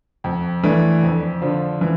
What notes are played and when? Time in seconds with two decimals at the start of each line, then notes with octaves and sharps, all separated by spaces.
0.24 F2
0.63 E3 A3 D4
1.03 F2
1.42 D3 F3
1.81 E3